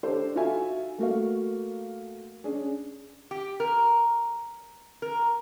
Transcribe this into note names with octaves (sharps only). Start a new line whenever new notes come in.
D4 G4 A4 C5
D#4 F4 F#4 A4 E5 G#5
A3 A#3 F#4 A#4 F5
C#4 D4 G#4
G4
A#4
A#4